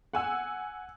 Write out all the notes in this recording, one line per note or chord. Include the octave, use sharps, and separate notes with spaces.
F#5 G#5 E6